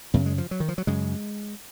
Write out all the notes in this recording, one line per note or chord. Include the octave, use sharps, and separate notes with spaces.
F#2 C#3 B3
G#3
F3
F#3
D#3
F3
F#3
F#2 C#3 G#3